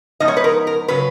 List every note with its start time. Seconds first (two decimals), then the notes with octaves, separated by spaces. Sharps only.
0.20 G#2 F3 B3 D#4 D#5
0.28 C#5
0.37 B4
0.44 A#4
0.67 A#4
0.88 C#3 F#3 B4